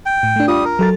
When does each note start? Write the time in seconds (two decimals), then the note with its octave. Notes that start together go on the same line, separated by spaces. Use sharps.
0.06 G5
0.23 A2
0.36 A3 D4
0.48 G3 F4 D#6
0.65 A#4
0.79 F#3 A4 A6